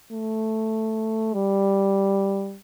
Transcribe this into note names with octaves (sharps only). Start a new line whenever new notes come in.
A3
G3